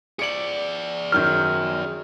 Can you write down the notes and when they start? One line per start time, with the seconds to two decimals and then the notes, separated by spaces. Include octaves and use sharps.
0.19 G#4 D5 C#7 D7 F#7
1.12 F#2 D#3 F#3 F6 G6